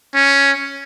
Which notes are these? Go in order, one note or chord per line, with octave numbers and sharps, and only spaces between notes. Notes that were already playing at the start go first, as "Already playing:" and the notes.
C#4